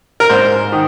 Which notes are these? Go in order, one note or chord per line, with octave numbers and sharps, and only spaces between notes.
A#4
G#2 C5
D#3